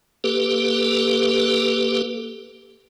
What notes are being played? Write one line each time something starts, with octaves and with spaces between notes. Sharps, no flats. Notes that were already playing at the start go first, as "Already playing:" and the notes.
A#3 G4 A4 B4